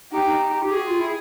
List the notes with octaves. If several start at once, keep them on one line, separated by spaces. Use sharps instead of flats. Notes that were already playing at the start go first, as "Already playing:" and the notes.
D#4 G4
D#4
G4
F#4 G#4
F4
E4